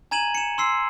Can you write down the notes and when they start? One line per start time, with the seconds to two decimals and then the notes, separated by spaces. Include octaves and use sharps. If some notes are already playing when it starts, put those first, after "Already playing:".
0.11 G#5 A#5 G#6 D#7 E7 F#7
0.35 C#7 E7
0.58 C6 E6 C7